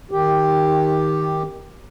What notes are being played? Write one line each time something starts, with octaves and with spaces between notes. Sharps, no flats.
D#3 G4